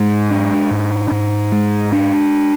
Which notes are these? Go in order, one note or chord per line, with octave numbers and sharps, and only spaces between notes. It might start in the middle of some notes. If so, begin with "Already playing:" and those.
Already playing: G#2 G#3
D4
G#2
G#2
G#3
D4